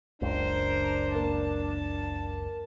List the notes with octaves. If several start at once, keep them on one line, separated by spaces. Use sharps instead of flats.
F#1 C#2 D4 A#4 C5
A#3 A5